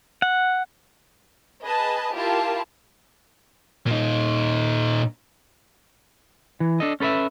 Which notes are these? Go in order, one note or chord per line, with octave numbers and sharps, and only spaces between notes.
F#5
G#4 B4 D#5 A5
E4 F4 G4 A#4 A5
A#2 D#4
E3
D4 A4 D#5
C#4 A4 B4 D#5 E5